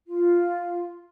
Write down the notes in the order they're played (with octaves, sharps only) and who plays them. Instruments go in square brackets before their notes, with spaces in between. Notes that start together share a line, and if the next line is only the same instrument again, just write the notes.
[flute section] F4